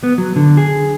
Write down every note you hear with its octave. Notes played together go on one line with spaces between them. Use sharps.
B3
F#3
D3
G#4